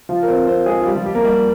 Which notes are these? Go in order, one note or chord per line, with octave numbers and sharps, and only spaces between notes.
F3 F4
A#4
C4 C5
C4 C5
G#3 G#4
F4
G3 G4
F3 F4
G3 G4
A#3 A#4
G3 G4